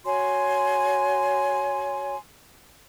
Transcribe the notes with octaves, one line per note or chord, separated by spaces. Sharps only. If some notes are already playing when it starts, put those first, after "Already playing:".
F#4 C#5 G#5 C6